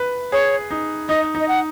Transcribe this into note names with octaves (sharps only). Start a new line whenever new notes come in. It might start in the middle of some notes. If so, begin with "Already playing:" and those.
Already playing: B4
G#4 C#5
D#4
D#4 D#5
D#4
D#5
F#5